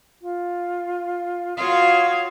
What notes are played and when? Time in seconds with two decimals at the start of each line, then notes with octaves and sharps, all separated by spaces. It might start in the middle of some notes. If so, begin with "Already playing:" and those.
0.21 F4
1.57 F4 F#4 C#5 F5 D#6